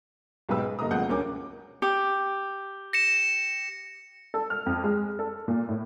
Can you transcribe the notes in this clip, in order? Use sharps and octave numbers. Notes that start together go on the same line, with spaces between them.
B1 G#2 B2 G4 B4 E6
G#3
G2 D3 A#3 D#5 A#5 D#6
C#2 B2 F3 F#5 G6
D2 C#4 A#4 D6
G4
A#6 C#7 E7
A4
F6
F2
G#3
A4
A#2
A2